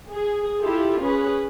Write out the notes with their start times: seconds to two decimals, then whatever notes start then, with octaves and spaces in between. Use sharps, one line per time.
0.12 G#4
0.61 E4 F4 G4 A4
1.00 C#4 G#4 B4